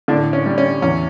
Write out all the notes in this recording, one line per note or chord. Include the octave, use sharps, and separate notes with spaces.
A2 D3 D4
C#4
G3
C#4
E2 C#4